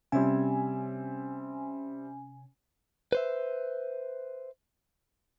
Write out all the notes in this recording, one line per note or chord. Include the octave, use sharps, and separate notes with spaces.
C3 G3 C4 C#4 E5 G#5
B4 C5 E5